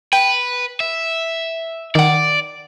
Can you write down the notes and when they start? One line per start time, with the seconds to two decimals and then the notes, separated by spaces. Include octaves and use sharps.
0.13 B4 G5
0.80 E5
1.95 D#3 D5 F#5